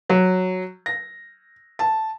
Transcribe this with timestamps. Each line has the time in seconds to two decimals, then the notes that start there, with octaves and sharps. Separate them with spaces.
0.09 F#3
0.86 A#6
1.79 A5